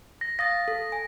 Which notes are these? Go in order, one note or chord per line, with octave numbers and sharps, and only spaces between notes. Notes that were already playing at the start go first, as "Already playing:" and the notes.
A#6
F5 D#6 A6 A#6
A4
G#5